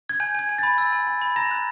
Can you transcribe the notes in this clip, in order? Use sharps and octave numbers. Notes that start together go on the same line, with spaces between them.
G#6
G#5 G6
G#5 G#6
G#5
A6
B5
E6 A6
G#5
G#5
B5
A#5 A#6
F#6